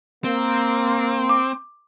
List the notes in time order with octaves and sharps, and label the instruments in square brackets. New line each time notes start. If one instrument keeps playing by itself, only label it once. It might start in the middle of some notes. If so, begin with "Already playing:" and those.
[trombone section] A#3 [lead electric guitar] C4
[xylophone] D6